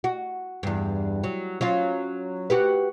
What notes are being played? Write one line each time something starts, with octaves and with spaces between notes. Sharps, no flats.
F#4
E2 G2
F#3
F#3 C#4 F4
F#4 G4 B4